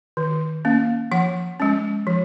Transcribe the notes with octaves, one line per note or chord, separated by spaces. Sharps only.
D#3
A#3 C#4
F3 F#5
G#3 C#4
F3